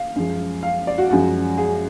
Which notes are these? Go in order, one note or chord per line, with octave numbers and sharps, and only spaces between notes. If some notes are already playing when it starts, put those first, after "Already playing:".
Already playing: F5
F#2 F3 G#3
F5
D5
F#4
F#2 F3 G#3 F#4
G#4